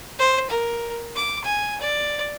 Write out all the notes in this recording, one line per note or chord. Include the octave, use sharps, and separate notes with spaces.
C5
A#4
D6
G#5
D5